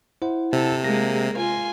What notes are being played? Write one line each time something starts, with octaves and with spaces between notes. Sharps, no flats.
E4 C5 F#5
C3 A4
G#3 A#3 G#4 A#6
F4 G#5 C6